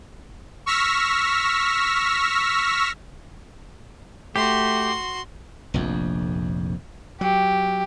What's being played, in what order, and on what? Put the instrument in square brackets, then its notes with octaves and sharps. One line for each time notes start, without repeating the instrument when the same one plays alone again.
[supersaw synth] C#6 E6 F6 A#6 B6
[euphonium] A3 [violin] F#4 C6 [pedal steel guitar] G4
[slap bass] F1 A#1 F2
[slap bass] F#3 [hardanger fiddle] G4